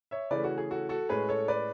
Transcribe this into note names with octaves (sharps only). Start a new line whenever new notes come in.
C#5 E5
C#3 E3 A3 C#4 B4 D5
F#4
G#4
F#4 A4
F#4 A4
A2 G#3 C#4 G#4 B4
A4 C#5
B4 D5